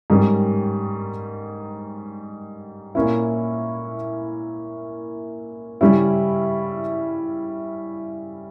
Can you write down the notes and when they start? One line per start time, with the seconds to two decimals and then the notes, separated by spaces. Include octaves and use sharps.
0.10 G#2 D#3 G3 C#4
2.95 A#2 A#3 C#4 E4
5.81 C#3 G3 C#4 E4